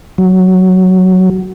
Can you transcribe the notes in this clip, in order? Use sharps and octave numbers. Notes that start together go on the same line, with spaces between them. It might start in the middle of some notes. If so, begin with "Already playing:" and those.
F#3